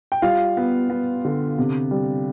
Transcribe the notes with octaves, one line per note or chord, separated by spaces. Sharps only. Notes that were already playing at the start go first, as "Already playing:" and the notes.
G5
G3 F4 F5
B3
B3
D3
C3
G3